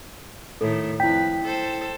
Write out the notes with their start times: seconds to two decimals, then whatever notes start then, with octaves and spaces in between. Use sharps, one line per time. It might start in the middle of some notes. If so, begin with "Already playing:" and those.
0.61 A2 D#3 A4
1.00 F2 E4 B4 G5 B6
1.42 A4 C5